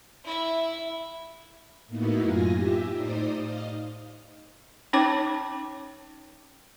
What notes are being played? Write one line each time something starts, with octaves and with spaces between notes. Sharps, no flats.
E4 E5
A2 A#3 B3 D#4 E4 F#4
F#2 F4 G#5 A#6
G4 E5
A2 D#4 C5 D5 D#6
D#5 F5
C#4 D#4 C#5 G5 D6